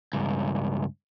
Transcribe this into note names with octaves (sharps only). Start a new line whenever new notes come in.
C#2 G2